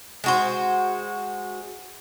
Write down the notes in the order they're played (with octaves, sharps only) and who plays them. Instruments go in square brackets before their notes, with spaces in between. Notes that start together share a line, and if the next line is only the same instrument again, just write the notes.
[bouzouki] G#3 F#4 C5